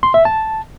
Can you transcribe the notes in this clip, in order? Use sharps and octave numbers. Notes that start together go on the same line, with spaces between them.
C6
E5
A5